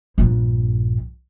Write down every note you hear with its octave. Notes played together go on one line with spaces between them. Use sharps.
A#1 G2